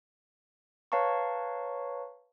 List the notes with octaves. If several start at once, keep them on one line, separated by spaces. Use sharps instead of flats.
B4 C#5 F5 A5 A#5 C#6